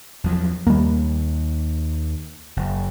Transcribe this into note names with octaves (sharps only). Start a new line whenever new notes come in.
E2 F3 F#3
D#2 G3 A#3
F#1